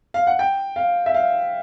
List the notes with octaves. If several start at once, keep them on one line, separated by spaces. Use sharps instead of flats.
F5
F#5
G5
F5
E5
F5